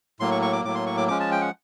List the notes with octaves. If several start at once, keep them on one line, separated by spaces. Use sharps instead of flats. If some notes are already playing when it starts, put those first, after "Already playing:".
A2 F#3 A#3 C6
C#6
C#6
D6
A2 F#3 A#3 D6
C6
C#6
D6
F3 G#3 C#4 D6
A5
G5
F#5